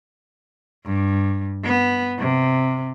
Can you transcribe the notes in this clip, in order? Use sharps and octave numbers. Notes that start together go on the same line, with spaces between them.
G2
B3
C3